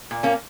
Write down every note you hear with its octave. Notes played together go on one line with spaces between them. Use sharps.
A#2
A#3 C#4